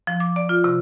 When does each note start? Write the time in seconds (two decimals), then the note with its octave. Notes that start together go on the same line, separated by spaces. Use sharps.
0.07 F3
0.20 D6
0.36 D5
0.49 F4
0.64 C3